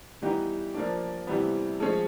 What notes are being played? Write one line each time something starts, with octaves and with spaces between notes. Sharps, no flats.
E3 G3 B3 D#4 G4
F3 A#3 D4
C3 E3 G3 B3
F3 G#3 C#4